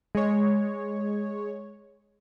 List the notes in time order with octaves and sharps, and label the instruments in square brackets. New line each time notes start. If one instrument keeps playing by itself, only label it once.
[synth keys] G#3 C#5